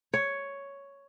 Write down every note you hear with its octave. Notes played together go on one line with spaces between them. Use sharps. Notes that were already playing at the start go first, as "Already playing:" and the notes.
C#5